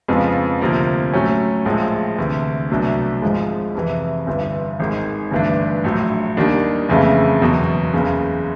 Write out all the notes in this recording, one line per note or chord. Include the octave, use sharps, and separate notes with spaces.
F2 C#3 F3 G#3 B3
D2 C3 F3 A#3
A2 F#3 A3 C#4
A#1 A2 F3 G#3
D2 C3 E3
C2 B2 F#3 A3 D4
G#1 G#2 F3 G#3
F2 C3 E3
G1 G2 E3
G#1 G#2 D#3
G1 G2 E3 A3 D4
A#1 A2 F#3
D#2 D#3 G3 A#3 D4
F#1 F2 C#3 E3 A3
F#1 E2 B2 F#3
F#1 E2 C#3